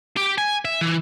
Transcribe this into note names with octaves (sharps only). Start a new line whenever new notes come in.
G4
G#5
E5
E3